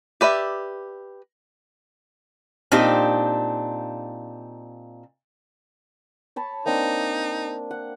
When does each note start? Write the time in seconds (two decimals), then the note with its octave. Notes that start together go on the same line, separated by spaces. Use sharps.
0.21 G4 B4 D5 E5
2.72 A#2 C4 D4 D#4 G4
6.36 C#5 A5 B5
6.65 A#3 C4 D4 D#4
7.71 F#5